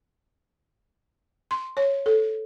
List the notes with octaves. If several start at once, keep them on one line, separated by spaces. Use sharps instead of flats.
C6
C#5
A4